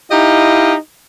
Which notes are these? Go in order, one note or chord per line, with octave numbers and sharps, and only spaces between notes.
D#4 E4 G4 D#5 F5